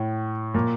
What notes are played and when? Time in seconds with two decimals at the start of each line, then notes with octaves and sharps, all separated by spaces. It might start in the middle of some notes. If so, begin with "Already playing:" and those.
Already playing: A2
0.54 A#2